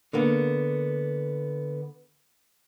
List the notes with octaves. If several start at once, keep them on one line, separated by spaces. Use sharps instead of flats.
D3 A#3 B3